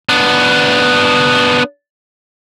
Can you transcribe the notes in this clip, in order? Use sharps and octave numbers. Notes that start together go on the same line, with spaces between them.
B3 D4